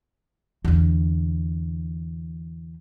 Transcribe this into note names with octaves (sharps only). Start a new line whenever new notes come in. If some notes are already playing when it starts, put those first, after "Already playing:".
E2 D3